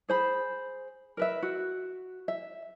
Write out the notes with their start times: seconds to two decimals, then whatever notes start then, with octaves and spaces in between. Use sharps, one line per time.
0.09 G#4 C5 B5
1.17 A#4 B4 E5
1.42 F#4
2.28 E5